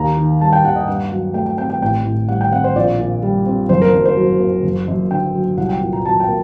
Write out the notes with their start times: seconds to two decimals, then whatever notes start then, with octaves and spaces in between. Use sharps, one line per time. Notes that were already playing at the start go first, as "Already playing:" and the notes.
Already playing: D#2 A#5
0.17 D#3
0.41 G3 A5
0.53 G5
0.64 D#2 F#5
0.76 D#5
0.88 G2 F#5
1.12 F#3
1.34 A3 G5
1.46 G5
1.58 C4 G5
1.70 G5
1.82 A1 G5
2.05 A2
2.28 G3 F#5
2.41 G5
2.52 C4 F#5
2.64 C5
2.75 A#1 D5
2.99 A#2
3.23 G3
3.46 C4
3.69 F#1 C5
3.82 A#4
3.94 F#2
4.05 C5
4.17 F#3
4.40 A#3
4.64 F#1
4.88 F#2
5.11 D3 G5
5.35 F#3
5.58 C2 F#5
5.69 G5
5.81 A#2
5.93 A#5
6.05 F#3 A5
6.20 G5
6.28 A#3